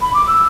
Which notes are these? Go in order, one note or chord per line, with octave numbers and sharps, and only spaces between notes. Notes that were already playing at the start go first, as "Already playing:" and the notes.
B5
D6
E6